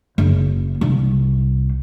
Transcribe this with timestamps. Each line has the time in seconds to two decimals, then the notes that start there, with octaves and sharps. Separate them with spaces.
0.18 F#1
0.81 C2